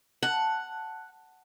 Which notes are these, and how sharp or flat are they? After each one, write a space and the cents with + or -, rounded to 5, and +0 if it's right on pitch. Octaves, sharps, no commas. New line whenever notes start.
F#5 +0 A5 +0